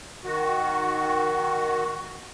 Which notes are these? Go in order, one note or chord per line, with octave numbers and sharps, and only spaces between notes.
D#3 F#4